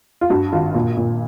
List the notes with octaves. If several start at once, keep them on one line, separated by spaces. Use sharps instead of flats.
F4
G2 F#4
G#1 F4
A#2
A#2